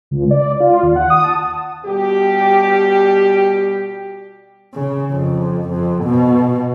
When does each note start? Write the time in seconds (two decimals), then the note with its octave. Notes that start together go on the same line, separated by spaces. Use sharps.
0.11 C#2
0.31 D5
0.60 F4
0.83 D#2
0.96 F#5
1.10 D#6
1.24 A5
1.85 B2 G3 G4
4.74 C#3
5.12 F2
5.69 F2
6.04 B2